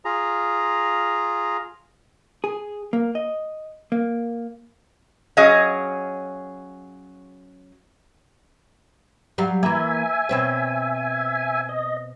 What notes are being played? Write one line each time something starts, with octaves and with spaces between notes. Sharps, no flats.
F4 G#4 A#5
G#4
A#3
D#5
A#3
F#3 C#4 G#4 D#5 F5
F#3 G3 F5
E3 A#3 E5 G#5
B2 C4 C#5
D#5